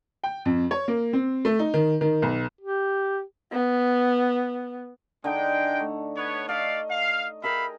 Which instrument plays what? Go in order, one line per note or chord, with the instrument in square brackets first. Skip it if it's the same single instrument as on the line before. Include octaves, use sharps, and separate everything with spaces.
[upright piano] G5
F2
C#5
A#3
C4
A3
D#4
D#3
D#3
B1
[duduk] G4
[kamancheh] B3
[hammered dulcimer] D3 D#4 [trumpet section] G#3 G5
[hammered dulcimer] A3
[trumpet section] B3 C#5
[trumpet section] A3 D5 F5 [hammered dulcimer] D#5
[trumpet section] F5
[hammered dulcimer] G#4 A#4 G5 [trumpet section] E5 F5 B5